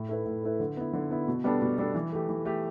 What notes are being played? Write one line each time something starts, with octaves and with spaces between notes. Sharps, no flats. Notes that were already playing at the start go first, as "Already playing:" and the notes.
Already playing: A2
A3 E4 B4
A2
A3 E4 B4
D3
B3 E4
D3
B3 E4
B2
G3 B3 D4 A4
B2
G3 B3 D4 A4
E3
A3 G4
E3
A3 G4